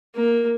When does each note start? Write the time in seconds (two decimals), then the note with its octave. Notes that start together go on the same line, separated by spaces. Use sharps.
0.15 A#3